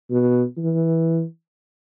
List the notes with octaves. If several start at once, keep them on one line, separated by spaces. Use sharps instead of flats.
B2
E3